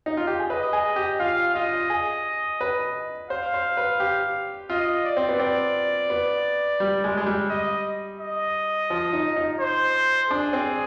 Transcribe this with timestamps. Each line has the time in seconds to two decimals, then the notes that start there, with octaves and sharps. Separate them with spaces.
0.06 D#4
0.17 F4
0.27 G4
0.40 G#4
0.50 B4 D#5
0.73 G#4
0.96 G4
1.20 F4 F5
1.55 F4 D#5
1.90 G#4
2.61 B4
3.30 C5 F5
3.54 C5
3.77 B4
4.00 G4
4.70 F4 D#5
5.04 D5
5.17 C4
5.29 B3
5.40 C4 D5
6.10 B3
6.80 G3
7.04 G#3
7.17 G#3
7.26 G3
7.50 D#5
8.20 D#5
8.90 F3
9.13 D#4
9.36 D#4
9.60 C5
10.30 D4 G#4
10.53 C4